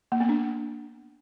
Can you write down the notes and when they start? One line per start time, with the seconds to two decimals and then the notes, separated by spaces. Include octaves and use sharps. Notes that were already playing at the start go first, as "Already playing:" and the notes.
0.12 A#3
0.20 B3
0.29 D4